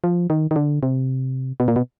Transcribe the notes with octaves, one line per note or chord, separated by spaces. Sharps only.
F3
D#3
D#3
D3
C3
B2
A#2
B2